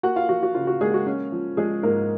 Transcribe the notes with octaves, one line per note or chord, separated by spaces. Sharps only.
A#3 F#4 F#5
F4 F5
F3 F#4
F#4
C#3 F4
F#4
G#3 A#3 G#4
F#4
C#4
F3
F3 G#3 G#4
G#2 A#3 A#4